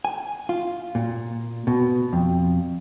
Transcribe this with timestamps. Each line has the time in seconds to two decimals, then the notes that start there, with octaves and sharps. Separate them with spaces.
0.05 G#5
0.49 F4
0.95 A#2
1.67 B2
2.13 F2